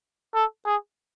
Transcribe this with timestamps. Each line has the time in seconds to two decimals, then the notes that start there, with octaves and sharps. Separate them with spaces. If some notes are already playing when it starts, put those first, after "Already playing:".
0.35 A4
0.66 G#4